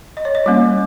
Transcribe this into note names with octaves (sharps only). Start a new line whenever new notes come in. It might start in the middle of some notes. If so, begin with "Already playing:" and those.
D#5
C#5
D#5
G3 A#3 C#4